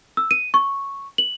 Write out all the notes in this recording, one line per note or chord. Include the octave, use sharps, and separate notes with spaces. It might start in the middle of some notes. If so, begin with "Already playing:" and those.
E6
D#7
C#6
F#7